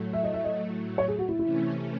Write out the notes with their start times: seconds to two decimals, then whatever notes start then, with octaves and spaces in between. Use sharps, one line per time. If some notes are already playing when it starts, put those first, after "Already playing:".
Already playing: A2 F#3 A3
0.13 E5
0.24 D#5
0.34 E5
0.44 D#5
0.98 C#5
1.08 G#4
1.19 F#4
1.29 E4
1.39 C3 E3 A3 C#4 E4